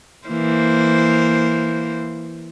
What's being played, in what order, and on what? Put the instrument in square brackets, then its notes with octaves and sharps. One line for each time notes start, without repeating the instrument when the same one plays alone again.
[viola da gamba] E3 A#3 C5